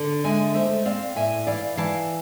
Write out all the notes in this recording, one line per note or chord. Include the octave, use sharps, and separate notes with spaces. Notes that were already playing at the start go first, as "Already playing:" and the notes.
Already playing: D3
G#3 E5 G#5
A3 C5 E5
C4 D5 F5
A2 E5 G#5
E3 D5 F5
E3 F5 A5